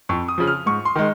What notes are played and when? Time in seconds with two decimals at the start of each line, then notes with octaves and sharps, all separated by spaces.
0.09 F2 C#6
0.28 D#6
0.38 C#3 F3
0.47 F6
0.66 G#2 C#6
0.85 C6
0.96 D#3 G#3